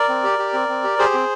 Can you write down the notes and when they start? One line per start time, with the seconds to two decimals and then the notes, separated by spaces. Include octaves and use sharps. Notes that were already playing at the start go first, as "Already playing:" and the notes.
Already playing: A#4 D5
0.09 C4
0.24 G4
0.39 G4
0.53 C4
0.69 C4
0.84 G4
0.99 G4 G#4 C5
1.14 C4